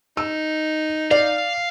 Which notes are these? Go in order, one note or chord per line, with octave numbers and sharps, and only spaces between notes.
D#4 E6
D5 F5